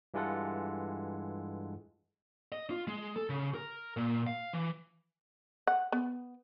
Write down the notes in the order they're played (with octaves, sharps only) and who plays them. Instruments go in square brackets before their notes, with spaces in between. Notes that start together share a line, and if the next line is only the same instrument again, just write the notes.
[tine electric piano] G2 E3 G#3 F4 A4 F#5
[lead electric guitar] D#5
F4
G#3
A4
C#3
A#4
A#2
F5
E3
[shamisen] F#5
B3